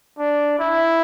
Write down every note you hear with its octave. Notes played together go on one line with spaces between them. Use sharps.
D4
E4